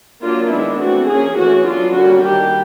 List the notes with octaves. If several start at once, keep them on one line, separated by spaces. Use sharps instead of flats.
F#3 A#3 D4 F4
D#3 G#3 B3 D4 E4
E3 A3 C4 F#4
F3 A#3 C#4 G#4
E3 A3 C#4 F#4
F#3 B3 D4 F4
D3 G3 A#3 C#4 F#4
D#3 G3 A#3 D4 G4